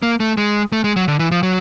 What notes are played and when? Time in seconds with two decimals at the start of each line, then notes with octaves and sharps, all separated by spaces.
0.03 A#3
0.20 A3
0.37 G#3
0.73 A3
0.84 G#3
0.96 F#3
1.08 D3
1.19 E3
1.31 F3
1.43 F#3